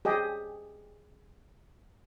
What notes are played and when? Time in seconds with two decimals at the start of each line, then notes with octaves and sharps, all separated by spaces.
0.05 G4 G#4 D#5